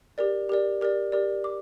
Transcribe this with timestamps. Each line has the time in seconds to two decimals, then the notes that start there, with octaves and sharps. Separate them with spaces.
0.18 G4 A#4 D5
0.49 G4 A#4 D5
0.81 G4 A#4 D5
1.12 G4 A#4 D5
1.44 D6